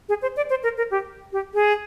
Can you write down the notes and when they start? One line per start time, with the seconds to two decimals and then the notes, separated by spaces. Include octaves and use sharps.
0.09 G#4
0.22 C5
0.37 D5
0.50 C5
0.63 A#4
0.78 A#4
0.91 G4
1.33 G4
1.54 G#4